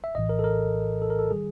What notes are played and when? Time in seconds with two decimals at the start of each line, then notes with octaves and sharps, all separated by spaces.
0.04 E5
0.15 A#1 A2 E3 D#5
0.29 A#4
0.39 A4
0.44 A#4
1.02 A4
1.10 A#4
1.19 A4
1.31 D#3 G3 G#4